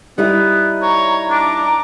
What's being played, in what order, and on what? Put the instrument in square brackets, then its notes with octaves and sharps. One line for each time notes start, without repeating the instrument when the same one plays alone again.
[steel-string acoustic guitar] G3 D#4 E4 [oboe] B3
[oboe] C#5 [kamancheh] A#5
[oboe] D4 [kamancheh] A#5 D6